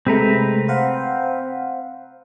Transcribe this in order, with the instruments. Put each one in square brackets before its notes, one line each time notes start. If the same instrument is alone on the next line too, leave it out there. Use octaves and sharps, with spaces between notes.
[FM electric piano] C3 G#3 A3 [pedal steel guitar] C4 B4 A#5
[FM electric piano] C5 F5 F#5